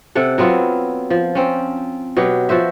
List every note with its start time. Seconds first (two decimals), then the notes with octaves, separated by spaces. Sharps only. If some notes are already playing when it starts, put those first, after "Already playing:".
0.15 C3 A4 F#5
0.38 F#3 B3 C4 F4
1.10 F3
1.35 C4 C#4
2.17 B2 F#3 G4
2.49 F3 F#4 C5 E5